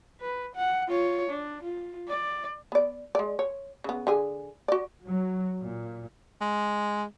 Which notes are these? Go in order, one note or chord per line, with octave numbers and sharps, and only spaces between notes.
B4
F#5
F4 C#5
D4
F4
D5
B3 D5
G#3 D5
C#5
C#3 B3
D3 G#4 G#5
F#4 D5
F#3
A#2
G#3